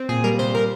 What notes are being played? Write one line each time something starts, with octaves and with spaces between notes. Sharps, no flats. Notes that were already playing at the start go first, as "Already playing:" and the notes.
Already playing: C4
A#2 G#4
G3 A#4
C3 C5
G3 A#4